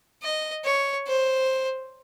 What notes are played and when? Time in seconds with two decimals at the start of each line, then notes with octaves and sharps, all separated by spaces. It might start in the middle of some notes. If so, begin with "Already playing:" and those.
0.23 D#5
0.65 C#5
1.07 C5